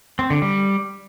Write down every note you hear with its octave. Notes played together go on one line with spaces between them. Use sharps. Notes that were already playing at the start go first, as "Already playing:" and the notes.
C4
D3
G3